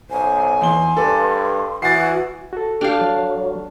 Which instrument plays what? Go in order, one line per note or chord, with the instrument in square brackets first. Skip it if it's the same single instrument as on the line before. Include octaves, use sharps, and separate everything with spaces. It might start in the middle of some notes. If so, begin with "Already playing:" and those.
[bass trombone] B1 [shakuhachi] C5 [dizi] G#5
[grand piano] E2 G7 [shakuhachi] C6
[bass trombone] G2 [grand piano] A4 B4 D5
[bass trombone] E3 [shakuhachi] F#4 [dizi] F#5 [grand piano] A6 C7
[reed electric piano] F#4 A4
[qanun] D4 F5 [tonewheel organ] G4 G5 F6
[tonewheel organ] F#3